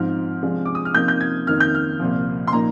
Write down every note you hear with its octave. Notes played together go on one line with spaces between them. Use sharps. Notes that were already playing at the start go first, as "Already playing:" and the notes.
Already playing: G#2 F3 C4 D#4 F6
C3 F3 G#3 D4
D6
D#6
F6
C3 F3 A#3 D#4 G6
G6
G#6
F2 D#3 A#3 D#4 F6
G6
F6
C2 A#2 F3
C6
A#2 F3 A#3 D#4 A#5